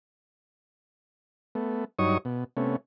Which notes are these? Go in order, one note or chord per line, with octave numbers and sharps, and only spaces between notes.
A3 B3
G2 F#3 D#4 C#5 C#6 D#6
B2
C3 A3 B3 C#4